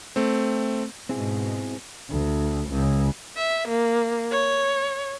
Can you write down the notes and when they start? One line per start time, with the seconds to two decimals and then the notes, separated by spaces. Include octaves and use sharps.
0.16 A3 C4
1.09 G#2 B2 C4 E4 G#4
2.10 D2
2.70 C#2
3.36 E5
3.68 A#3
4.31 C#5